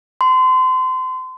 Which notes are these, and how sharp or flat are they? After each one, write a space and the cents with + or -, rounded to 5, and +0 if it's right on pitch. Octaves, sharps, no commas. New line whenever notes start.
C6 -30